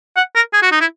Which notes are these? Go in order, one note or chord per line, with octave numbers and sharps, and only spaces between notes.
F#5
A#4
G#4
F#4
D#4
E4